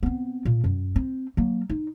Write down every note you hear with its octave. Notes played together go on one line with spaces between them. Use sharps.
B3 C4
A#2
F#2
C4
F#3 A#3
D#4